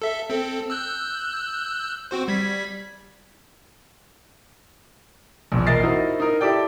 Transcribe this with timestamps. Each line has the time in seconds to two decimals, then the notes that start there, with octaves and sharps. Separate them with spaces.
0.02 A4 E5
0.30 C4 A4
0.70 E6 F#6 G6
2.11 C4 F#4 C5
2.28 G3 G#6 B6
5.52 A#1 E2
5.67 A#1 A#4 D#5 A6 C7
5.83 C4 D#4 E4 F#4 A#4 C5
6.20 D#4 A#4
6.41 E4 G4 A4 D5 G5